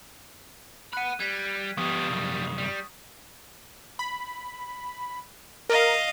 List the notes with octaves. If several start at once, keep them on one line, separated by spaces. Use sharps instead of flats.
F#5 B5 F#6 D#7
G3 G#6 B6
F3 G3 B3 G4 C#6 D#6
C2 F#2
G3
B5
A#4 D#5 F5